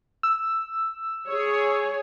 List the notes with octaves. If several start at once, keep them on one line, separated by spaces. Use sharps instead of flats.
E6
G#4 C#5